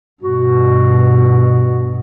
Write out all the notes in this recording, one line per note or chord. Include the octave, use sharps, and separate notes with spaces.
G2 B2 F#4